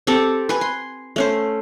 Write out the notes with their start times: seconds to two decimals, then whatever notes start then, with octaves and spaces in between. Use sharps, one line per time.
0.07 C4 G4 A4
0.49 B4 G#5
0.61 C6
1.16 A3 C#4 C5